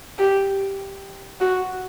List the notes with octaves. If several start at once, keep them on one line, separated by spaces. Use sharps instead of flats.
G4
F#4